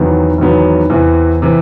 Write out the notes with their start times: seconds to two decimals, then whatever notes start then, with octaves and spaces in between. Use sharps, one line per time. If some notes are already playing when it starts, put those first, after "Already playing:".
Already playing: E2 C3 D#3 F#3 B3
0.38 E2 C3 D#3 F#3 B3
0.90 E2 C3 E3
1.42 C3 E3